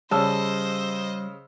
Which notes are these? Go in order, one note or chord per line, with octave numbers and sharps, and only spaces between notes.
C#3 G3 C5 D#5 A5 E6